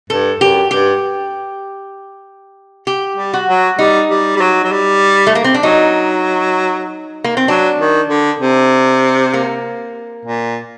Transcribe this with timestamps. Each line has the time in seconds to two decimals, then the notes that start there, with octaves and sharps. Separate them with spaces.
0.10 G2 A4
0.40 F#2 G4
0.71 G2 G4
2.87 G4
3.17 G3
3.34 F#4
3.49 F#3
3.79 G3 D#4
4.10 G3
4.36 G3
4.41 F#3
4.64 F#3
4.72 G3
5.27 A3
5.35 A#3
5.44 C4
5.54 D4
5.63 F#3 D#4
7.24 A#3
7.37 C4
7.48 F#3 D4
7.79 D#3
8.09 D3
8.41 C3
9.34 A#3
10.25 A#2